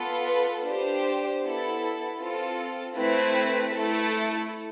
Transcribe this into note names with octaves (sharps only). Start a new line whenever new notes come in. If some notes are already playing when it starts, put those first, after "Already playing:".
Already playing: B3 F4 A4
B4
D4 G4 C5
B3 E4 A4
C4 F4 A4
A3 C4 E4 B4
A3 E4 A4